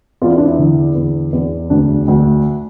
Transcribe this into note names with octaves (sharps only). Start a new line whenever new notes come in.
E2 F4
E4
D4
E4
D3
E2
E2
D2 D4
D2